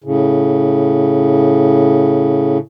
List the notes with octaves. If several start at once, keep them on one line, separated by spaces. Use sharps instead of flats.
A2 C#3